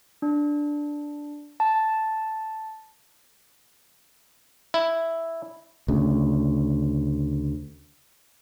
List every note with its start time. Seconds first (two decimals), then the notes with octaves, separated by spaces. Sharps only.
0.22 D4
1.60 A5
4.74 E4
5.88 D2 C#3